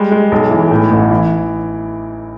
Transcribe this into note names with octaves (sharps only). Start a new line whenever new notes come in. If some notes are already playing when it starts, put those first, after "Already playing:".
Already playing: G3 G#3
G#3
B1
E3
A2
A1
E3